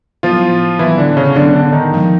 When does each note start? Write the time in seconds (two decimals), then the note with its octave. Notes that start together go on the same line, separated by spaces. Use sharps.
0.23 A2 F3 F#3 B3 E4 F4
0.79 A2 E3 F#3 B3 E4
0.98 D3 D4
1.17 C#3 C#4
1.35 A2 D3 F#3 B3 D4
1.54 D3 D4
1.72 D#3 D#4
1.92 G#2 F3 G#3